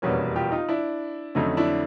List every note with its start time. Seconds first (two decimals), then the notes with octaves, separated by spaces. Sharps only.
0.02 F1 E2 B2 G3 A#3 C#4
0.36 F4 G4
0.52 D#4 F4
0.69 D4 E4
1.35 F2 D3 F#3 A3 C#4 D#4
1.57 D4 E4